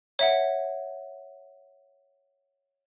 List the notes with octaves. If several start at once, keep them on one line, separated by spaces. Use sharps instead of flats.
C#5 E5 F#5